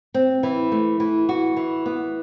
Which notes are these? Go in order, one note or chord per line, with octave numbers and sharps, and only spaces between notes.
C4
E3
A3
E3
F#4
E3
B3